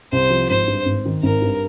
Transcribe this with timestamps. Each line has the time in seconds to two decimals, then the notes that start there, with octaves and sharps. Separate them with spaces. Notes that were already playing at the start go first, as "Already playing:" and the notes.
0.12 C2 C5
0.30 F3
0.49 G#1 C5
0.67 G2
0.86 G#1
1.05 D#3
1.23 G#1 A#4
1.42 G2